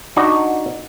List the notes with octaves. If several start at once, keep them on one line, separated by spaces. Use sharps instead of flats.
D4 D#4 F#4 D5 D#5